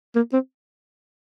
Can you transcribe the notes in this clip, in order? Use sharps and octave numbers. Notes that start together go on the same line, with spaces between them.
A#3
C4